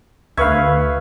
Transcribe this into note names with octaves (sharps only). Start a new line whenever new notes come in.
D2 B4 E5 F5 C#6 G#6